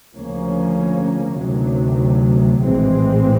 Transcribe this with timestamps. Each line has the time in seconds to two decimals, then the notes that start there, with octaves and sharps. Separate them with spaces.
0.14 D2 C#3 F3 A#3 C#4
1.37 D2 C3 D#3 F#3
2.60 A#1 A2 E3 G#3 C4